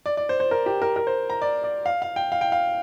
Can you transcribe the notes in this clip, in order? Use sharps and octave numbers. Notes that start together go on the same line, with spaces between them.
D5
D5
C5
C5
A#4
G4
A#4
A#4
C5
A#5
D5
D5
F5
F5
G5
F5
G5
F5